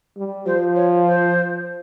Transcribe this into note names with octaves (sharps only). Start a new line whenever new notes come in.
G3
F3 C5
C#5
C5